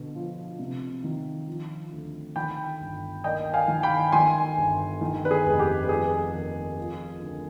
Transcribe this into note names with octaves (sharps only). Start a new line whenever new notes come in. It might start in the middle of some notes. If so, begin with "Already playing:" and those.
Already playing: B2 D3
F3
C3
D#3
F3
D2
D#3 G5 B5
G1
D#2 D#5 G5
F5 G#5
D#3
G5 B5
D#3 G#5 C6
G1
D#3
B4
G#4
F1
G4
B4
F3 G#4
D#2
F3
D2